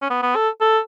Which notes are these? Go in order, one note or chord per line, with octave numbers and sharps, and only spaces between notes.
C#4
B3
B3
A4
A4